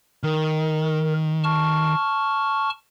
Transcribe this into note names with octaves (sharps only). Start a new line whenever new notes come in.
D#3 A#4
A5 C#6 F6